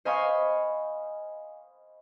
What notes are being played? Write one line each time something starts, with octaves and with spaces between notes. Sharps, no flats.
C5 D#5 F5 G#5 B5 C#6